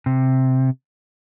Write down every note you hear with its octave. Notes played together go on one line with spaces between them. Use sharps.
C3